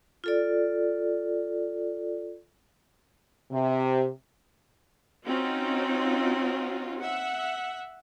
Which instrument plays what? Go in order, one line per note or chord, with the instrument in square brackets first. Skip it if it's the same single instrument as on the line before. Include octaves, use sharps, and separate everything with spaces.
[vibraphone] F4 A4 D5
[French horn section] C3
[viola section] C4 C#4 D#4 F4 F#4
E5 F#5